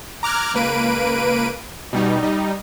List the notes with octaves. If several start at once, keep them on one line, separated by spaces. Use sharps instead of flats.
A#5 D6 F6 F#6 G#6
C#2 A#3 B4 D7 D#7
B2 G3 D#4
G3 D#4